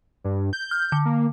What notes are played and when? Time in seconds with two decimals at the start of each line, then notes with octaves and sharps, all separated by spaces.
0.24 G2
0.53 G6
0.71 F6
0.92 D3
1.05 A#3